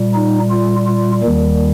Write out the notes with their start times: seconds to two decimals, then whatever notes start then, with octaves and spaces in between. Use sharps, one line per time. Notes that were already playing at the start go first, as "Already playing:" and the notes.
Already playing: A#2 G3
0.14 D#4
0.50 F4
0.86 F4
1.23 D#2 D#3 G3